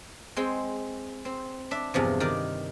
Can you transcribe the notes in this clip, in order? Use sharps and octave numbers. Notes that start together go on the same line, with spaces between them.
G#3 C4 G5
C4
D4 E5
E2 G2 C3 F3
D#3 A#4 D5